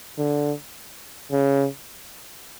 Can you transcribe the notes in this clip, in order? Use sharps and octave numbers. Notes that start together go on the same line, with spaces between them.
D3
C#3